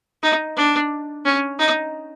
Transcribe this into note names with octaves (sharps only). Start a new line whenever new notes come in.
D#4
D4
C#4
D#4